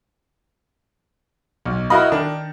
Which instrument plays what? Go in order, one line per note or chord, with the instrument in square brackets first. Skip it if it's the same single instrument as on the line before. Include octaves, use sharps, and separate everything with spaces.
[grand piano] B1
[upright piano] E4 F#4 D#5 [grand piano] A#4 F5 B5
[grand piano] D#3 [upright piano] D4